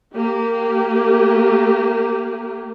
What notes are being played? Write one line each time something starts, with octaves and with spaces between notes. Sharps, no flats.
A#3 G4